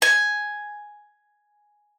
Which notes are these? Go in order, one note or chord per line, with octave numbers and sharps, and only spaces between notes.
G#5